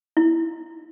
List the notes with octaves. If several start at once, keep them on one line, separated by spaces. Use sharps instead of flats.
E4